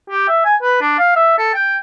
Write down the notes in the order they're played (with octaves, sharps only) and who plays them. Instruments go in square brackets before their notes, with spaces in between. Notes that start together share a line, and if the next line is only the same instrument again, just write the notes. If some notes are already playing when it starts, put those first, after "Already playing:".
[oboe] G4
E5
G#5
B4
D4
F5
E5
A4
G5